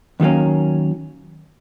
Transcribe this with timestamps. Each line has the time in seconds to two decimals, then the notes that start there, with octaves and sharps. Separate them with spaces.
0.20 D#2 D#3 F#3 A#3 C#4